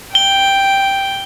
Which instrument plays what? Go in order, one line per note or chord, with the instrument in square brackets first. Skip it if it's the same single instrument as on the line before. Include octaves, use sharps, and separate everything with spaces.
[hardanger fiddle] G5 [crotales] G7